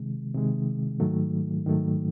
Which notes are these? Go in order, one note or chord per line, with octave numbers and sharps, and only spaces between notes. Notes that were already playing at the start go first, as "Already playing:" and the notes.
Already playing: C3 D#3 G#3
C3 D#3 G#3
G#2 D#3 F#3 A3
G#2 D#3 F#3 A3